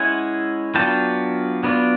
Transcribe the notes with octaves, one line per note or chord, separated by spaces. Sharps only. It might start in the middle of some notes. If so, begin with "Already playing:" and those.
Already playing: G#3 C#4 E4 F#5 G#5
F#3 B3 D4 F4 G5 A5
F#3 B3 D4 F4